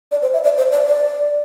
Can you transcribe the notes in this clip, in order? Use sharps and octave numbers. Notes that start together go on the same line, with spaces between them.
D5
C5
E5
D5
C5
D5
D5